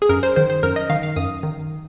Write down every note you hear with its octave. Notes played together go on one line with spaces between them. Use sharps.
G#4
F#2 A#4
C5
D#3 C5
C5
F#2 A#4
D#5
D#3 F5
F5
F#2 D#6
D#3